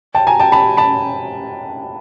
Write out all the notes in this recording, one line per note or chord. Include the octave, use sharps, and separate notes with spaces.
G5 A5
G#5 A#5
G5 A5
A5 B5
A5 B5